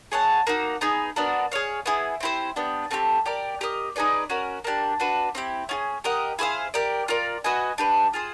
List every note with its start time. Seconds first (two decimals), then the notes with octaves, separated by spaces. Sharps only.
0.12 G#4 C#5 F#5 A5
0.47 A#3 D#4 F#4
0.81 B3 D#4 G#4
1.16 B3 D4 F#4 A#4
1.52 G#4 C#5 F5
1.86 B3 E4 G#4
2.20 C4 E4 G4 C5
2.56 B3 D4 G4
2.91 A3 C4 D#4 G4
3.26 G4 A#4 D5
3.61 G4 A#4 D#5
3.96 D#4 G#4 B4 D5
4.30 C#4 F#4 A#4
4.64 A#3 D4 G4
5.00 D4 F#4 B4
5.35 C4 E4 G4
5.69 C#4 F4 G#4
6.04 G4 A#4 D#5 F#5
6.39 E4 G#4 C5 F5
6.74 G4 A#4 D5
7.08 F4 A#4 D5
7.44 F#4 B4 D#5 G#5
7.78 D4 G4 B4
8.13 F4 G#4 C5